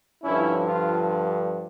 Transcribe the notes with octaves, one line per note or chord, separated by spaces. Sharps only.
G2 D3 F3 C#4 E4
D4 F4